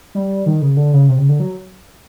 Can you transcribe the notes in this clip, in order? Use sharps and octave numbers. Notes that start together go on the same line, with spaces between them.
G3
D#3
C#3
D3
C#3
C3
C#3
D3
F#3